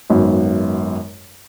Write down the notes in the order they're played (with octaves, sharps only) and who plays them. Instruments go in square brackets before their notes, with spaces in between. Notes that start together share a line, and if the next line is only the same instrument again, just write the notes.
[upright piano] G#1 F#2 B3